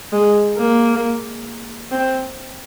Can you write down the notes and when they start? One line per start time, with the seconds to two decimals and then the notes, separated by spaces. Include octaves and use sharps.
0.12 G#3
0.57 A#3
1.91 C4